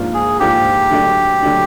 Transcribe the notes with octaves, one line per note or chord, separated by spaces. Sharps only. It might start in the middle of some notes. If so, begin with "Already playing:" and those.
Already playing: G#2 F3 A#3 D4 F4
G#4
G#2 F3 A#3 D4 F4 G4
D3 F#3 A3 D4
D3 F#3 A3 D4